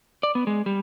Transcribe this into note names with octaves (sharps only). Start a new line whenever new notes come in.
D5
B3
G#3
G3